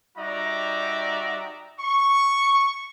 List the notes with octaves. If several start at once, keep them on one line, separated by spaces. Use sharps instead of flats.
G3 D#4 F#4 D5 E5 A#5
C#6